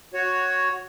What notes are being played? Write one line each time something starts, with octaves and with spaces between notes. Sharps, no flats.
F#4 C#5